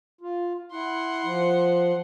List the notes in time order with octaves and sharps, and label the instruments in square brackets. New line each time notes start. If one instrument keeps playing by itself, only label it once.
[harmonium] F4
[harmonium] E4 [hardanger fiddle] F#5 C6
[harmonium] F3